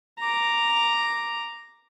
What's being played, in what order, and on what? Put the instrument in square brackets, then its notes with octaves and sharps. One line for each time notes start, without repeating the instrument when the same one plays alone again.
[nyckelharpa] A#5 D6